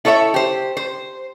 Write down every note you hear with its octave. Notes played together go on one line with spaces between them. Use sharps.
E4 A4 C#5 D#5 E5
G4 C5
C5